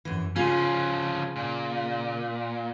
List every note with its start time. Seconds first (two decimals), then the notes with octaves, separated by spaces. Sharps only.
0.05 F#2 E3
0.36 C#3 F3 C#4 F4 G#4
1.36 A#2